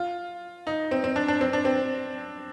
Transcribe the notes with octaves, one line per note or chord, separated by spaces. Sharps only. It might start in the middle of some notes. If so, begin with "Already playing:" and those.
Already playing: F4
D#4
C4
C4
D4
D4
C4
D4
C4